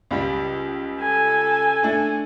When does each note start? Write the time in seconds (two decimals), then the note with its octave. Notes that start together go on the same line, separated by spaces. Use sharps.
0.11 C#2 G3
1.01 A4 G#5
1.83 A3 D4